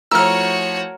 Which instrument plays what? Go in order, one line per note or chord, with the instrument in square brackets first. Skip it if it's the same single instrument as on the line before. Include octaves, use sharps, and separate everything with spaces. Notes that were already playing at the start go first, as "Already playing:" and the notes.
[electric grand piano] F3 A3 E4 [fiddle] F#4 C#5 [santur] A#4 [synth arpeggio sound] E6 F6